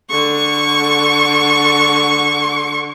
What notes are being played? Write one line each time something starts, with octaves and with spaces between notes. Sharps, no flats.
D3 C#6